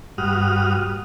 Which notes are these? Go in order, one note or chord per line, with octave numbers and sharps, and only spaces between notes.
G2 F#4 D#6 F6